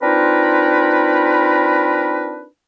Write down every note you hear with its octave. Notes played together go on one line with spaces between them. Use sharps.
C4 D4 D#4 F4 A#4 B4